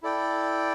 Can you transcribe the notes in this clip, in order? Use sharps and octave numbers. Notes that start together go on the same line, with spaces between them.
E4 A4 D5 G5